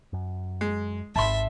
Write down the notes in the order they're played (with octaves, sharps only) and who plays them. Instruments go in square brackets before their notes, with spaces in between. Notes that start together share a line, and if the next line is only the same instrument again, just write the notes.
[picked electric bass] F#2
[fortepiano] G#3
[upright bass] G#1 [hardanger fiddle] E5 [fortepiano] A5 B5 C6